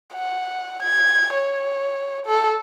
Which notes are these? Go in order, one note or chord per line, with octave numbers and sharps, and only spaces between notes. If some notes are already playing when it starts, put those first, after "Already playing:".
F#5
G#6
C#5
A4